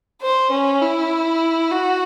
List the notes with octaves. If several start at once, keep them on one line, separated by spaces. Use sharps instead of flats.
C5
C#4
E4
F#4